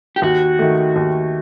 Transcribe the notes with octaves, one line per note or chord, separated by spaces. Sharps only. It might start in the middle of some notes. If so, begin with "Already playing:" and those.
G4
D#2 F#4
D#3 A3
D#2